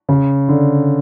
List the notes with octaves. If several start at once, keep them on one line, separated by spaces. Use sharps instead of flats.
C#3
D3